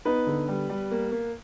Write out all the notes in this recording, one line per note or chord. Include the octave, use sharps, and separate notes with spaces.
B3 D#4 B4
D3
G3
G3
A#3
A#3